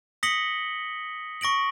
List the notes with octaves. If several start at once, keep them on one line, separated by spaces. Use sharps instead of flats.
D#6 A#6 B6 C#7 F#7 G7
C#6 A#6 D7 F#7